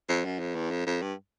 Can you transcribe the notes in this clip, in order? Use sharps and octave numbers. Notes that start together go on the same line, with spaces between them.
F2
F#2
F2
E2
F2
F2
G2